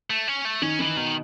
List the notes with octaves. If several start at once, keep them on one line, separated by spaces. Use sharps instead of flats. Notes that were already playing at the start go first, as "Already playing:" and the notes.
A3
C#4
A3
D#3 C#4 D#4
D#3 E3 D#4
B2 D#3 B3